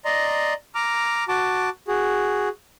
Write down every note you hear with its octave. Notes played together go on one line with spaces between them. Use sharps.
D5 D#5 A#5 C6
A#5 D6 F6
F#4 A5 D6
F#4 G#4